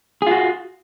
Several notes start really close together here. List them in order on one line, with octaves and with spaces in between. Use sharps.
G#4 F4 F#4